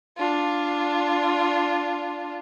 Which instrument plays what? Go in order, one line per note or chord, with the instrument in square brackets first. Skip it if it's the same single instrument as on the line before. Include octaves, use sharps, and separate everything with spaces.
[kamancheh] D4 F4